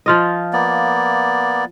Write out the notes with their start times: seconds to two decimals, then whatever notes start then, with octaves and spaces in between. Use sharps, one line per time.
0.06 F3 F4 D#5
0.53 A#3 B3 D5